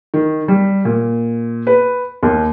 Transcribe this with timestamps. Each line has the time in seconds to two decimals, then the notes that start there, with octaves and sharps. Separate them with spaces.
0.14 D#3
0.48 G3
0.85 A#2
1.67 B4
2.23 D#2